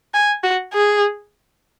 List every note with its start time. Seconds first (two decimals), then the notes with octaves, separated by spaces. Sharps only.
0.14 G#5
0.43 F#4
0.73 G#4